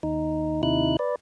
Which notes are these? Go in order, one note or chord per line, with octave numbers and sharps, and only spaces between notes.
D#2 D#4
D#2 C3 D#4 E4 F#6
B4 D5